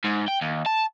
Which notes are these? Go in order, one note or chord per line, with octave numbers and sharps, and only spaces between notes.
G#2
G5
D#2
A5